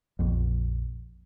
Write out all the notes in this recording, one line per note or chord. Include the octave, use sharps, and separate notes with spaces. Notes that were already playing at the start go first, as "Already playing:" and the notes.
A#1 F2